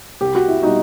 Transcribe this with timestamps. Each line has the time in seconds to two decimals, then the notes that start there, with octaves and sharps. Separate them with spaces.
0.21 C2 G4
0.35 F#4
0.48 E4
0.63 B2 G3 D#4 F#4